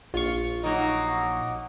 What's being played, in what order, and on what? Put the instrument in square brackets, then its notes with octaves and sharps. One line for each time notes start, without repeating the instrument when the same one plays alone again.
[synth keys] A#1 C#6 [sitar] F4
[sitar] F#3 A#3 D#4